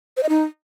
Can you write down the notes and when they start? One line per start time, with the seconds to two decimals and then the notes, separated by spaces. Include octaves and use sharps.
0.17 C5
0.23 D#5
0.29 D#4